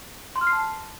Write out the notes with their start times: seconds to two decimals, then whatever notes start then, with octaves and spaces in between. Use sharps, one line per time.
0.36 C6
0.41 F6
0.47 C7
0.53 A5